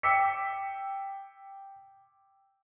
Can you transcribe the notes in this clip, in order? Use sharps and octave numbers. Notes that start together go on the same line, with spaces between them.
G5 D6 E6 B6 C#7